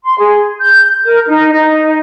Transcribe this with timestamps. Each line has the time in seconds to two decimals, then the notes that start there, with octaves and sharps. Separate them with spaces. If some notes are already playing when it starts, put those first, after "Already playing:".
0.03 C6
0.19 G#4
0.61 G6
1.05 A#4
1.26 D#4
1.52 D#4